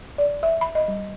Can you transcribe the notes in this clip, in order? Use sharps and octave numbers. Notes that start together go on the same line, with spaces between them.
D5
E5
B5
D#5
G3